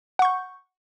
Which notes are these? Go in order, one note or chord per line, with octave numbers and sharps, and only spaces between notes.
F#5 C#6 G6